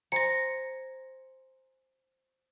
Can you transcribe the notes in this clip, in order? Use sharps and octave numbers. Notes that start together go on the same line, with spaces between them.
C5 G#5 A#5 A#6 C#7